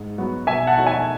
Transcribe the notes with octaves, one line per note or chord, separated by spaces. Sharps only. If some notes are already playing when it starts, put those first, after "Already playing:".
Already playing: G#2
F#3 B3 F#4
B2 E5 G#5
F#5 A5
A3 D#4 F#4 C#5
E5 G#5